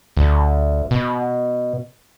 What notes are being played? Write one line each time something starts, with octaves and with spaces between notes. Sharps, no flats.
D2
B2